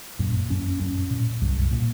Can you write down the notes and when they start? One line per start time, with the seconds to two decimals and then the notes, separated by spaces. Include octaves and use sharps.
0.19 F#2 A#2
0.50 F#2 C#4
0.80 F#2 C#4
1.11 A#2
1.42 C2 F#2
1.72 A#2